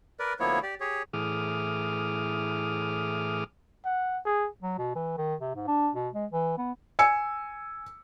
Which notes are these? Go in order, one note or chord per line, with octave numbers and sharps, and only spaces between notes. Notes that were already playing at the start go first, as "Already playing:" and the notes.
A#4 B4 D5
D2 F3 A#3 B3 E4 C#5
G4 D5
G4 G#4 C#5
A2 E3 G#4 D6 D#6 F6
F#5
G#4
F#3
B2
E3
D#3
C3
G#2
D4
B2
G#3
E3
B3
G#5 E6 C#7